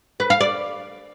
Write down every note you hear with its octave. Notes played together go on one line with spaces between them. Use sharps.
B4
F5
D5